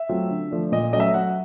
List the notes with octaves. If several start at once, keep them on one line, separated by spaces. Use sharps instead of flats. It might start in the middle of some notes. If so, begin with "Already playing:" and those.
Already playing: E5
F#3 A3 C4 F4
D3
F3 A3 D4
A#2 D#5
F#3 A3 C#4 D#5
E5
F#3 F#5